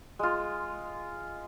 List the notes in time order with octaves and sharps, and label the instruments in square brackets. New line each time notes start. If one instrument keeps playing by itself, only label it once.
[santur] G#3 F4